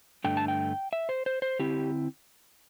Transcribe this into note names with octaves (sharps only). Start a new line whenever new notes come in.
G2 D3 A3 D4 G5
A5
G5
E5
C5
C5
C5
D3 C4 E4 G4